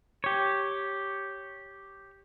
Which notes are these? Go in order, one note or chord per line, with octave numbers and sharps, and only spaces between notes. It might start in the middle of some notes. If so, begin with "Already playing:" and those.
G4 C#5